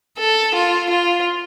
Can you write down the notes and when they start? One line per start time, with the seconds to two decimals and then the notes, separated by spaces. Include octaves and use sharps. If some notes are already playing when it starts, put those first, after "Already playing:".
0.18 A4
0.55 F4
0.90 F4